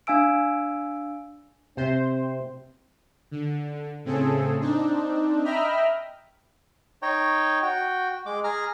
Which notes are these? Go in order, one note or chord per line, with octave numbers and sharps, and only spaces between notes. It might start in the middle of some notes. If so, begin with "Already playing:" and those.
D4 F5 G#5 E6 D7
C3 C4 C5
D3
A2 C#3 C4 G#4 A4
C4 D4 D#4
D#5 E5 G5 A#5 B5 F6
D#4 C#5 G5
F#4 G5
G#3 D6
G#4 A#5 F6